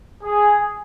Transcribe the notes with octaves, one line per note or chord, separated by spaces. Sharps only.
G#4